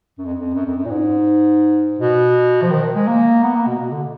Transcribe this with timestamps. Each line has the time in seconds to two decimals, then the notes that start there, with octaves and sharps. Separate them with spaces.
0.18 F#2
0.25 F2
0.39 F2
0.54 F#2
0.66 F2
0.77 F#2
0.85 A#2
0.90 G#2
1.99 B2
2.62 F3
2.71 D#3
2.95 G#3
3.07 A#3
3.43 B3
3.55 A#3
3.67 B2
3.79 B2
3.91 D3